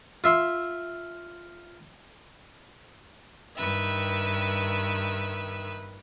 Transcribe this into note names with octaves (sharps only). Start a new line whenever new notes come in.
F4 E5 C6
G2 D#3 B4 E5